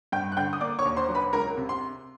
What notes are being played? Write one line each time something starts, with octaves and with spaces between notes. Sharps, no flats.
G2 G5 G6
F#6
D3 G5 G6
D#6
A#3 D5 D6
C#5 C#6
D#2
C5 C6
F#3
B4 B5
C#2 A#4 A#5
C3
C6